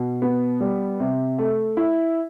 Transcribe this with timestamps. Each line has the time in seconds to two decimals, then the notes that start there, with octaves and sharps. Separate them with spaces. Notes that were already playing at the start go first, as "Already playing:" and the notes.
Already playing: B2
0.22 B3
0.60 G3
1.00 C3
1.39 A3
1.77 E4